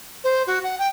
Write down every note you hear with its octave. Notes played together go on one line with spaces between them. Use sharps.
C5
F#4
F#5
G5